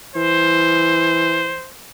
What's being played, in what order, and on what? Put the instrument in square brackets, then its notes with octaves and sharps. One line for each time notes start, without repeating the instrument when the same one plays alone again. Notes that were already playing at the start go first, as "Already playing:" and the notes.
[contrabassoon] E3 [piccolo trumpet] C5